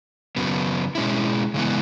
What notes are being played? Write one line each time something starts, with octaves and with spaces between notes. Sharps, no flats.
F#2 C#3 F#3 B3
B2 G#3 C#4 E4
C#3 E3 G#3 B3